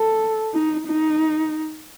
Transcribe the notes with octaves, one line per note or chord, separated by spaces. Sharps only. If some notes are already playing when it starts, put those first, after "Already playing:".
Already playing: A4
D#4
D#4